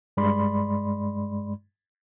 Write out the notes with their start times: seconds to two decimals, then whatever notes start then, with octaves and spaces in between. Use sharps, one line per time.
0.17 G2 G#3 D5 B5 C6